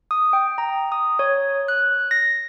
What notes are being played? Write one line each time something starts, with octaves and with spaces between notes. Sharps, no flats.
D#6
G5
A#5
D#6
C#5
F#6
A#6